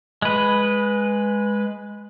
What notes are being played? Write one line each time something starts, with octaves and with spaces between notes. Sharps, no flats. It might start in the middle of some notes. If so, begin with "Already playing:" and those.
G#3 B4